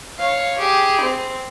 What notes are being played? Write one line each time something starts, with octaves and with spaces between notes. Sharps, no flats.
C#5 F5
G4 G#4
C4